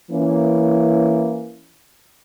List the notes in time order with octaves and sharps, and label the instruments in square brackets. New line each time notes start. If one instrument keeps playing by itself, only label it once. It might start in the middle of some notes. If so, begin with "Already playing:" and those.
[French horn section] E3 A#3 C#4 E4